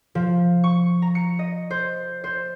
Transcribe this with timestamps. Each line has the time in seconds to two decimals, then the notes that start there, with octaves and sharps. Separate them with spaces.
0.15 F3
0.64 C#6
1.02 A#5
1.15 C#7
1.39 D#5
1.70 C5
2.24 C5